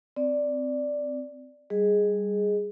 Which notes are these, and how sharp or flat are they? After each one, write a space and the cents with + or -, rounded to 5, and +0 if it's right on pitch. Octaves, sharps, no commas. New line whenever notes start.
C4 -15 D5 +0
G3 +0 G#4 +0 D#5 +0